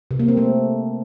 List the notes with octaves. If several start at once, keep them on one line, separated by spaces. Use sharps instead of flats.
C3
A#3
C4
A3